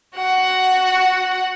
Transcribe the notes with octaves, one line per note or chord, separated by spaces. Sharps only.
F#4 F#5